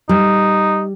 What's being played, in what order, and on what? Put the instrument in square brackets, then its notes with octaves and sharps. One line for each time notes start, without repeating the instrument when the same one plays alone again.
[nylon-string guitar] G3 [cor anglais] D#4